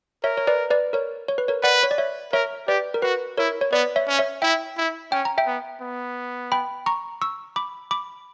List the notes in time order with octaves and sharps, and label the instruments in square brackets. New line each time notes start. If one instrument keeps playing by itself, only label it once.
[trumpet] A#4 [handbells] C#5 E5
[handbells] C#5
B4 D5
B4 D5
A#4 C#5
C#5
B4
A#4 C#5
[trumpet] B4 [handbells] D5 F#5
[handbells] C#5
D5
C#5 E5
[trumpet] A#4 [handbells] C#5 E5
[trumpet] G4 [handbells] B4 D5
[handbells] A#4
[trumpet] F#4 [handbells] B4
[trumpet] E4 [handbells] A#4 C#5
[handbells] C#5
[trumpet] B3 [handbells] B4 D5
[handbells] C#5 E5
[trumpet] C#4
[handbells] C#5 E5
[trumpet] E4 [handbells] E5 G5
[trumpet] E4
[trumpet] C#4 [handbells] G5
[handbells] A#5
E5 G5
[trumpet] B3
B3
[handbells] G5 B5
A#5 C#6
C#6 E6
B5 D6
B5 D6